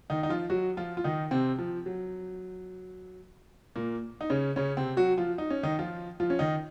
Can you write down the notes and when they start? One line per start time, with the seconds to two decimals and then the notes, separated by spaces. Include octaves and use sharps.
0.10 D#3 D#4
0.23 D#4
0.29 F3 F4
0.50 F#3 F#4
0.77 F3 F4
0.97 F4
1.04 D#3 D#4
1.31 C3 C4
1.58 F3
1.86 F#3
3.76 A#2 A#3
4.21 D#4
4.30 C#3 C#4
4.56 C#3 C#4
4.77 C3 C4
4.97 F#3 F#4
5.17 F3 F4
5.38 D#4
5.50 C#4
5.63 D#3 D#4
5.79 F3 F4
6.20 F3 F4
6.30 C#4
6.39 D#3 D#4